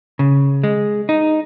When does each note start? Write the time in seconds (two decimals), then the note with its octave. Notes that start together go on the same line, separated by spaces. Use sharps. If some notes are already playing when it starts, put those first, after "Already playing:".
0.19 C#3
0.64 G#3
1.09 D#4